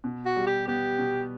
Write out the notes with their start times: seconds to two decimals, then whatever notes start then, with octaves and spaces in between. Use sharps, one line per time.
0.04 B2
0.26 F#4
0.36 G3
0.46 G4
0.68 B3 G4
0.98 B2